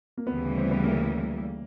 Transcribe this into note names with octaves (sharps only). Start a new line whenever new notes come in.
A#3
D2 C#3 E3 G3 B3
C4
B3
A#3